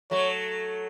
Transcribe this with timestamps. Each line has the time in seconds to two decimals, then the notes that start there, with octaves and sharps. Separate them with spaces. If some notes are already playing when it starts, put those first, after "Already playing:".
0.11 F#3 A3 C#5